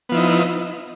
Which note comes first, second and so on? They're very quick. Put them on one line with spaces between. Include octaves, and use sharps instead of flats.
B3 F3 E4 D#4